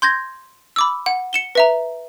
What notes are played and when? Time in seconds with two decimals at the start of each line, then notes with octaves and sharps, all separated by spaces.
0.02 C6 G6 G#6 A#6
0.76 B5 D6 E6
1.06 F#5
1.33 C#7 E7 G7
1.55 B4 E5 A#5